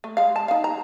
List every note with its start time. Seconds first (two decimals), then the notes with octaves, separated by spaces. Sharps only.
0.04 A3
0.17 G#3 F5
0.36 A5
0.48 D#4 F5
0.64 A#5